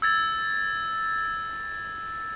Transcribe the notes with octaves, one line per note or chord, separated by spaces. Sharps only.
E6 G#6 A6